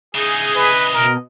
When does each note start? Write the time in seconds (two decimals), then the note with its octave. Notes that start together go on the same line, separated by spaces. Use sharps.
0.15 C#3 E3 D#4 G#4
0.55 B4 D#5
0.94 B2 A#4